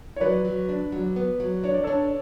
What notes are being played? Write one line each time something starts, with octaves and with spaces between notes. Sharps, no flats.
C#5
F#3 B4 D5
F#3
D4
F#3
B3
F#3
D4 C#5
D5
D4 A4 C#5